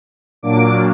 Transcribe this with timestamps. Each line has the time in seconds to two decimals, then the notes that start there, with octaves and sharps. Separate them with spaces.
0.43 A#2 F#3 A#3 D4 D6